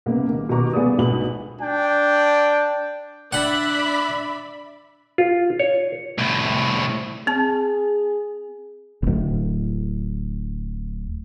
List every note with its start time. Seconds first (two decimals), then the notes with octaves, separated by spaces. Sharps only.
0.06 C2 C#3 A#3 B3
0.27 D#3 A#3
0.49 B2 D#3 G3 A#5 C#6 D6
0.74 C2 B3 G#4 A4 D5 D#6
0.98 G#1 D2 B2 B5 F#7
1.61 D4 G5
3.33 D4 D5 E5 F#5 B5
5.18 F4
5.59 C#5
6.18 C2 A2
7.27 C4 G#4 A5
9.02 D1 G1